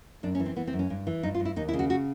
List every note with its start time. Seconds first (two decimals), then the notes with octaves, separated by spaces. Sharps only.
0.23 F#2 D4
0.35 C#4
0.40 E3
0.46 C4
0.56 E3 B3
0.67 C4
0.73 F#2
0.79 C#4
0.90 G2
1.07 E3
1.23 G2 D#4
1.35 F4
1.40 G2
1.45 E4
1.56 D#2 D#4
1.68 E4
1.73 C#3
1.79 F#4
1.90 F#4